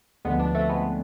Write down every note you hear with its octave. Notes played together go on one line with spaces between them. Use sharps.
D2 D3 F3 G#3 B3
B3 D4
A3 C4
G#3 B3